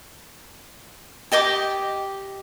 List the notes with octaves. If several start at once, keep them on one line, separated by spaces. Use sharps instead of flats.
G4 D#5 G5 D6